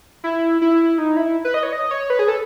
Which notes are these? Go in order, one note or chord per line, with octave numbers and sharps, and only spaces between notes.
E4
E4
D#4
E4
B4
D#5
C#5
D#5
C#5
B4
G#4
A4